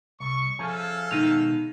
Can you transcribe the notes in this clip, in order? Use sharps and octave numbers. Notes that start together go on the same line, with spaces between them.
C2 C#6
F3 C#4 G#4 A4 E5 F5
B2 D#3 G#3 D#4 D#7 F7